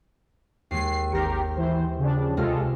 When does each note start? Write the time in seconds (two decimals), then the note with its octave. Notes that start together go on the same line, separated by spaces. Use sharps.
0.71 D#2 G#3 C7
1.12 G#1 G4 A#4 A#6 C#7
1.56 E3 C5
1.99 C#3 F3 D4
2.37 C#2 C3 G#3 F4 A4 F6